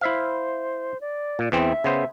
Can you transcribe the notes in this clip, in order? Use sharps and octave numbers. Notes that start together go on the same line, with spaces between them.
E4 C5 E5 F5
D5
A#2
E2 E3 C4 E5
C#3 B3 C5